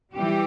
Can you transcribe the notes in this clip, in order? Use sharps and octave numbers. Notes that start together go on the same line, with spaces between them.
E3 G3 G4